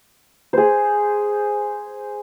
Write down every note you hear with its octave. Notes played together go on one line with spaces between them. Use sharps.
G#4 C5